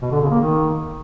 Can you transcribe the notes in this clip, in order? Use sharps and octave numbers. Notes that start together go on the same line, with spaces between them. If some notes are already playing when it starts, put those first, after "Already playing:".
B2
D3
C#3
A#3
D#3